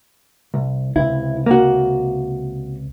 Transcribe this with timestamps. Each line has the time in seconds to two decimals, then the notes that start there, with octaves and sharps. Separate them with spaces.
0.54 C2
0.96 C#2 C3 E4
1.46 A#3 F#4